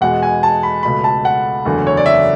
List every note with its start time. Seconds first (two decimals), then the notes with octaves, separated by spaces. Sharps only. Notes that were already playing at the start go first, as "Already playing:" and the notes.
0.01 E2 B2 G#3 F#5
0.23 G#5
0.43 A5
0.63 B5
0.83 C#2 B2 A3 B5
1.04 A5
1.25 F#5
1.65 F#1 E2 D3 A3
1.87 C#5
1.97 D5
2.06 E5